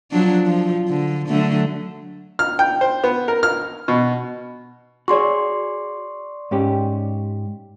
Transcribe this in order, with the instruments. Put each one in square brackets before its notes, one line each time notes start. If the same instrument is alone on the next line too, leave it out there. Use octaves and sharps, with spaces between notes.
[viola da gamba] F3 F#3 D4
F3
D3
D3 F#3 A3
[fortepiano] F6
G5
C5
B3
A#4
F6
B2
[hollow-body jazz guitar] F#4 G#4 C#5 [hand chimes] D5 C6 C#6
[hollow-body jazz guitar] G#2 C#4 G4